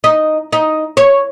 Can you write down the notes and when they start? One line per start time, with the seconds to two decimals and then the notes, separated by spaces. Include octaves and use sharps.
0.04 D#4
0.53 D#4
0.97 C#5